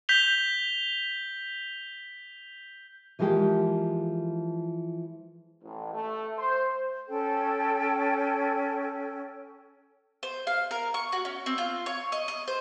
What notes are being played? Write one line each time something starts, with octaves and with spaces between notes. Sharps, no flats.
G6 B6 F7 G7
E3 F3 G#3 A#3 G4
A1
A3
C5
C#4 A4 G5
C5
F5
A#4
C#6
F#4
C#4
C4
F4
C#5
D#5
D#5
C5